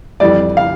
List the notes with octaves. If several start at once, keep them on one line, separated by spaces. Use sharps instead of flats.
F2 E3 G3 D5
F5